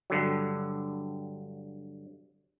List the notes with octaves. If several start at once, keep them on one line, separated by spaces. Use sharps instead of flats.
G2 D3 F#3